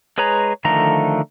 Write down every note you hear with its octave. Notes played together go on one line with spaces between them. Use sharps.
G#3 G#4 B4 C#5 A#5
D3 D#3 F3 A3 A#5